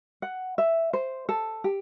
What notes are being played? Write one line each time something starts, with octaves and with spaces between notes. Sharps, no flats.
F#5
E5
C5
A4
G4